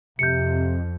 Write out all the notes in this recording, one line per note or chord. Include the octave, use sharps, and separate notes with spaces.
F2 C3 G6 C#7